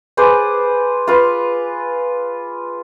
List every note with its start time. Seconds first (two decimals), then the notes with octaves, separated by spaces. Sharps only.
0.17 G#4 B4 C5 D5
1.07 F4 B4